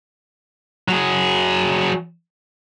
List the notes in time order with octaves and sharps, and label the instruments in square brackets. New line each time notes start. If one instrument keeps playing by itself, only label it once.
[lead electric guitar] F#3 G#4